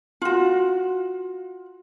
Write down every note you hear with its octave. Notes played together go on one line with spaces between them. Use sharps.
F4 F#4